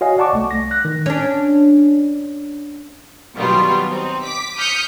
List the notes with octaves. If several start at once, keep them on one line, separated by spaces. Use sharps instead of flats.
F#4 C#5 D#5 F5 G#5
D5 F#5 A5 C#6 D6
C2 A3
A#6
F#6 A#6
D#3
C#4 D4
B2 D#3 F#3 G3 B3 F4
C4 D#4
D6 B6
D#6 F6 G6 B6 C#7